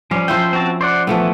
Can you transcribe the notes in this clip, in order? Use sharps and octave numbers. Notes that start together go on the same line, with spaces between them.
F3 G3 C#4
F3 E4 C5 E5 G5
C4 F#4 A5
C5 D5 F#5
E3 F3 A3 B3